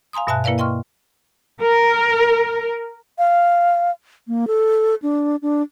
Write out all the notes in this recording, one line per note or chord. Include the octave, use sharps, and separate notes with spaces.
F5 G#5 A#5 C6 D#6
G2 B2 E5 G#5 A5 F#6
A#3 E4 A#4 B4 D5 F5
D#5 G5 C6 C#6 F6
A#4
F5
A#3
A4
D4
D4